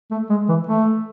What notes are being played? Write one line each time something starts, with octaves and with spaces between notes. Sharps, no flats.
A3
G#3
E3
A3